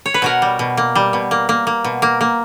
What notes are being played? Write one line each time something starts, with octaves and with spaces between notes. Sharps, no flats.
C#5
B4
B2 F#4 A#4
G3
B2
A#3
G3
B2
A#3
A#3
A#3
B2
A#3
A#3